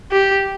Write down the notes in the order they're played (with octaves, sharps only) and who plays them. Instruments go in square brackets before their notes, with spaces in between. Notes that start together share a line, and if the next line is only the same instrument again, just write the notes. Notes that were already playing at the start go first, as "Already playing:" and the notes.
[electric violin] G4